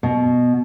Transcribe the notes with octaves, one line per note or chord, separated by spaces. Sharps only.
B2